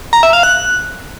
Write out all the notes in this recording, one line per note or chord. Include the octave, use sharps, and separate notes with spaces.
A#5
E5
F5
F#6